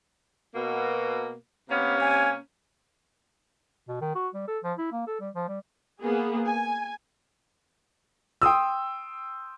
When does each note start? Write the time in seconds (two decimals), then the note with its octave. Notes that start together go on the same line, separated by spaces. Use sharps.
0.55 B2 A#3
1.70 C3 A#3 B3 C#4
2.00 G#5
3.88 B2
4.01 D#3
4.15 F#4
4.34 G3
4.48 A4
4.64 F3
4.78 E4
4.92 A#3
5.07 A4
5.20 G3
5.35 F3
5.48 G3
6.01 A#3 B3 G#4
6.47 G#5
8.42 G5 C6 D#6 E6